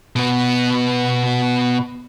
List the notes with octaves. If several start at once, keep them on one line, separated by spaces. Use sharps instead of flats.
B2 B3